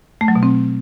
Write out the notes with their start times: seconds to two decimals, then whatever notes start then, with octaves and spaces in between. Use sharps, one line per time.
0.21 A3
0.28 F#3
0.35 B2
0.43 C4